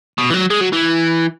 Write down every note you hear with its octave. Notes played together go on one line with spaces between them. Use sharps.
B2
E3
F#3
G#3
F#3
E3